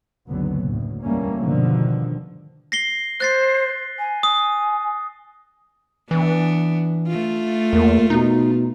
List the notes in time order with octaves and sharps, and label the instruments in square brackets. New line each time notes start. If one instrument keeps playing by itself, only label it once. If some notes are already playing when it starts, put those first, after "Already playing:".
[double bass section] F#1 C#2 D3 F#3 B3
D2 A2
E2 G3 A3 A#3 C#4
G2 B2 D3 D#3 F3
[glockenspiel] A#6 C7 G7
[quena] C5 [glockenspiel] F#6 A6 C7
[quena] G#5
[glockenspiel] D#6
[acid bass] E3 [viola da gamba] B3 D4
[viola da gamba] A3 F4
[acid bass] E2 [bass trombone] A#3
[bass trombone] B2 [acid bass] D#4